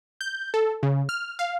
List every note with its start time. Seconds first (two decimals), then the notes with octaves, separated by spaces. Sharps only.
0.21 G6
0.54 A4
0.83 C#3
1.09 F6
1.39 F5